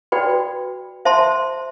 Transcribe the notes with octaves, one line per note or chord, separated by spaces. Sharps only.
F#4 B4 D5 G5 B5
C5 E5 A5 C6